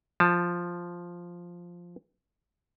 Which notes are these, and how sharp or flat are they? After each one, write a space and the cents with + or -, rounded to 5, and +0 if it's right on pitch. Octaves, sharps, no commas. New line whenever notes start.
F3 +0 A5 +10